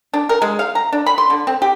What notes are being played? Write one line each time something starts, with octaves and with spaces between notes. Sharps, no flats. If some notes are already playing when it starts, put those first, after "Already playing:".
D4
A#4
G#3
F5
A#5
D4
B5
C6
D3
C4
G4